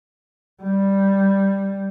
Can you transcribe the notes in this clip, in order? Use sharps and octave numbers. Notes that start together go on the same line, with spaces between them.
G3